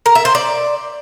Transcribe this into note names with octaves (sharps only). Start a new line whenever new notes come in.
A#4
E5
C5
D5